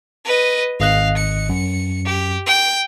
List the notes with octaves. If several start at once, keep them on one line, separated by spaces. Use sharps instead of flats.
B4 D#5
G#1 D#5 F5 F#6
C#7
F#2
G4
G5